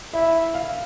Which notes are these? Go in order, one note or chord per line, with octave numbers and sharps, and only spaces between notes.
E4 E5
F5